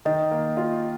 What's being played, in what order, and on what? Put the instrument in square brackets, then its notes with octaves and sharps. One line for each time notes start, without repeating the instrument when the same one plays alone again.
[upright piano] D#3 [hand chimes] D#5
[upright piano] A#3
F4